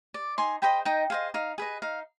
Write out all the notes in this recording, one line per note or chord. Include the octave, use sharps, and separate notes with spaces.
D5
D#4 G#5 C6
G#4 C5 D#5 G5 B5
D#4 D#5 G5
G#4 C5 D#5 F5
D#4 F5
G#4 B4 D#5
D#4 F5